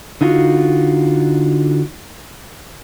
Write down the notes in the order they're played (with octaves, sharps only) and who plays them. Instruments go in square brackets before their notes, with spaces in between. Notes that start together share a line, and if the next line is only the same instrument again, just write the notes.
[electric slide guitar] D3 D#4 F4 F#4